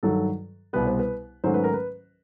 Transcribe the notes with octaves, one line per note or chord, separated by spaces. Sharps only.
G2 D#3 F#3 A4
C2 B2 G3 B3 B4
C5
B4
G#2 D#3 F#3 A3 C#4 C5
B4
A#4
B4